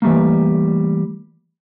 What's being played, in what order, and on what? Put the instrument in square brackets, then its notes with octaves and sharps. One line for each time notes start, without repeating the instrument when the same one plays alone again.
[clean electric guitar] E3 G3 A3 A#3